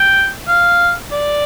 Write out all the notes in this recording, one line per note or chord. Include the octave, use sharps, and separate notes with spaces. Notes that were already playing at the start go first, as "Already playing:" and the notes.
Already playing: G5
F5
D5